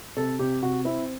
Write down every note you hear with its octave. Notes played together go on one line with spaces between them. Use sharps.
C3 A4
C3 G4
C3 F#4
C4 E4